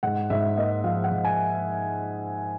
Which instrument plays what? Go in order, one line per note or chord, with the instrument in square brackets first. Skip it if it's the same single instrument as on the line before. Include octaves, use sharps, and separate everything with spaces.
[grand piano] G#2 F#5
G#2 E5
A#3 D#5
F3 F5
F#5
G#2
G#5